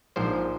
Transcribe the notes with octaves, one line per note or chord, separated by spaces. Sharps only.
A#1 G#2 F3 C5